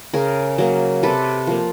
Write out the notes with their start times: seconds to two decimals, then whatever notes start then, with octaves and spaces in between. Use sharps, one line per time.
0.14 C#3 G#4 A#4
0.58 F#3 A#3
1.03 C3 A4 B4
1.47 F3 A#3